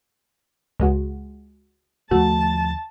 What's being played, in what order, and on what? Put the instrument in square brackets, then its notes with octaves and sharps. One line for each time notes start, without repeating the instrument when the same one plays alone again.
[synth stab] C#2 G#3 F#4
[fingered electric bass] D#2 D3 F3 [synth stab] A3 F#4 [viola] A5